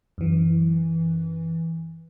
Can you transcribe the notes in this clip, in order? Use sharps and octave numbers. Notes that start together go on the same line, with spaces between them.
F#2 E3